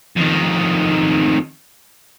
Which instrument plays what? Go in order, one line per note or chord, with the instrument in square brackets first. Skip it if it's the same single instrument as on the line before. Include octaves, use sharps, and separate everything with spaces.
[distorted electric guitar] F2 D#3